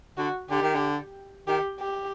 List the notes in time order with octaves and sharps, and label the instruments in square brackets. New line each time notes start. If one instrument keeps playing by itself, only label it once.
[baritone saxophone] D3 [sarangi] F#4
[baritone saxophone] D3 [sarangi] G4
[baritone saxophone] D#3
D3
[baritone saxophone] D#3 [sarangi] G4
[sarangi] G4